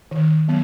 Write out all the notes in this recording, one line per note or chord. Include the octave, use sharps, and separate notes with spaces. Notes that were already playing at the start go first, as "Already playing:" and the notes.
D#3
F#3 B3